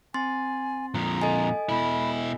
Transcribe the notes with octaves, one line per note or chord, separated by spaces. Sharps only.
C4 G#5 C6 A6
F2 A#2 A#5
A4 D#5 G#5
B2 E4 B5